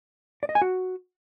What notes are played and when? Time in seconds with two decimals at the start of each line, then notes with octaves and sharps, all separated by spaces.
0.43 D5
0.49 D#5
0.55 G#5
0.62 F#4